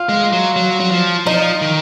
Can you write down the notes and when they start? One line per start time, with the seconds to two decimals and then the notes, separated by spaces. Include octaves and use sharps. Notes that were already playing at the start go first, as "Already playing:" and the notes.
Already playing: F4
0.09 G#3
0.33 F#3
0.56 F#3
0.80 F#3
0.91 F3
1.26 F3 D#4
1.62 D#3